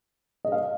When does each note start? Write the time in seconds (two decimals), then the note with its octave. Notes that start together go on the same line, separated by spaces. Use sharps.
0.45 D#5
0.52 F5